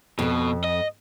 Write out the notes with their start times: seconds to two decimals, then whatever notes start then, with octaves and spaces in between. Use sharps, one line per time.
0.19 F2 B2 A4
0.64 D#5